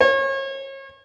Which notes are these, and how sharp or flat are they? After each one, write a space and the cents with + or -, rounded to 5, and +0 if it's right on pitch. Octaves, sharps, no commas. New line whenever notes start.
C#5 -35